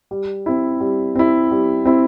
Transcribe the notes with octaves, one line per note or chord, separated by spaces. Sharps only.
G3
C4 E4
G3
C4 E4
G3
C4 E4